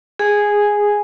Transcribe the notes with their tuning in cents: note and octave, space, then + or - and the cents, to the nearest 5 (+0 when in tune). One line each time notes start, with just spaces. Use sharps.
G#4 -10 G#5 +0